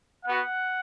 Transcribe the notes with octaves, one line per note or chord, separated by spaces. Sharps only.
B3 F#4 F#5